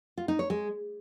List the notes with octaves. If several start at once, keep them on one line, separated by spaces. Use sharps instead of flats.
F4
D#4
C#5
G#3